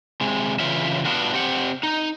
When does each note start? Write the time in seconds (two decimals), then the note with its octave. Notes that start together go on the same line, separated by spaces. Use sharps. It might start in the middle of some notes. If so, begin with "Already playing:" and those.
0.21 C3 G#3
0.60 C#3 E3 F4 E5
1.05 B3 D4 F4 F#4
1.33 C4 G4 F#5
1.83 D#4